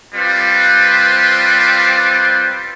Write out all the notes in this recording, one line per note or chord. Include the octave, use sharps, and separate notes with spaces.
G3 C4 F4 B4 C5